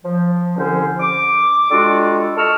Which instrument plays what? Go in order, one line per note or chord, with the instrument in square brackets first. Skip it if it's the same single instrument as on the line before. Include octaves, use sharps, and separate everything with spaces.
[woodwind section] F3
C2 D3 C#4 C5
D6
G3 G#3 D4 F4 F#4 A4
A4 D#5 C#6 E6 F6